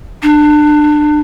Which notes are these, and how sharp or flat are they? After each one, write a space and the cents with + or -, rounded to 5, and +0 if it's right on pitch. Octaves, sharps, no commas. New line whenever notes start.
D4 +25